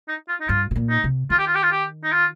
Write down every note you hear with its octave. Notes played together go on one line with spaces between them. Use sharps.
D#4
F4
D#4
G2 F4
C3
A#2
D#4
C3
D#3 F4
G4
F4
G4
F4
G4
D#4
F4